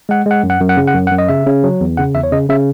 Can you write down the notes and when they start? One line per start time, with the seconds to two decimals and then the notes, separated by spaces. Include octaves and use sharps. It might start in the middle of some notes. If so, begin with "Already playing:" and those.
0.09 G#3 F#5
0.26 G#3 F#5
0.43 F#2
0.50 F#5
0.61 F#2
0.69 F#5
0.77 C#3
0.88 F#5
0.94 F#2
1.07 F#5
1.12 F#2
1.18 D#5
1.29 C#3 E5
1.47 C#3
1.64 F#3
1.81 E2
1.97 C#3 F#5
2.15 E2 E5
2.23 C#5
2.32 C#3 D#5
2.49 C#3 E5